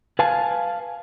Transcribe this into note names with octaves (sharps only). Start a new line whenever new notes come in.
B4 F5 G#5 A5